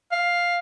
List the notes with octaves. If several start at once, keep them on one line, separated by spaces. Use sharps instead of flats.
F5